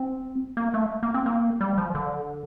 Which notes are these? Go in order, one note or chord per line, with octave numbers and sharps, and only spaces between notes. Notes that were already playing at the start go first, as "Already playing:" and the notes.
Already playing: C4
A#3
A3
A#3
C4
A#3
G3
F3
D3